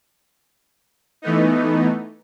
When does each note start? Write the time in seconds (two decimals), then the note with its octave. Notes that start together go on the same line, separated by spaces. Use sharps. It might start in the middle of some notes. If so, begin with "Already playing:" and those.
1.22 E3 A3 B3 D#4